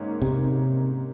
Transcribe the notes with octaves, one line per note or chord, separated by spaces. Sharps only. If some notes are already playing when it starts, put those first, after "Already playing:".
Already playing: G#2 D#3 A#3 C#4
C3